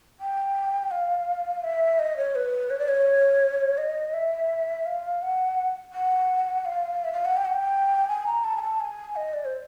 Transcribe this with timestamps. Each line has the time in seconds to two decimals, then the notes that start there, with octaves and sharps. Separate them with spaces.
0.20 G5
0.91 F5
1.64 E5
1.99 D#5
2.17 C#5
2.35 B4
2.70 C#5
2.79 D5
2.88 C#5
3.78 D#5
4.14 E5
4.86 F5
5.22 F#5
5.93 F#5
6.65 F5
7.04 E5
7.12 F5
7.25 F#5
7.37 G5
7.45 F#5
7.54 G5
8.09 G#5
8.27 A#5
8.44 A5
8.57 G#5
8.62 A5
8.80 G#5
9.16 D#5
9.33 D5
9.45 C5